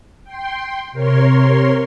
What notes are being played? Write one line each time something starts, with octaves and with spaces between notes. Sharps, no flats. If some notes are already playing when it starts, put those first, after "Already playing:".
G5 C6
C3 A#4 C#5 C6